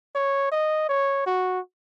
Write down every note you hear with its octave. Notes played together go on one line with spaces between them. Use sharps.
C#5
D#5
C#5
F#4